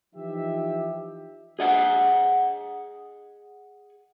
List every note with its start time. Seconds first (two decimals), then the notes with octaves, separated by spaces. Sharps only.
0.15 E3 F3 D#4 G4 E5
1.59 G#4 D#5 F#5